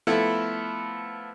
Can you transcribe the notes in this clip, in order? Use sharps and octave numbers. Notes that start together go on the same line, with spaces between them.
F3 A3 B3 E4 A4